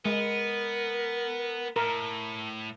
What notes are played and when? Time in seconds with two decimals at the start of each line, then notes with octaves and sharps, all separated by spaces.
0.05 G#3 B3 A#4
1.76 A2 A#4